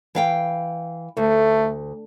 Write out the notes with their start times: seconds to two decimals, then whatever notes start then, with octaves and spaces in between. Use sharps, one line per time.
0.15 E3 F5 G5
1.17 D2 A3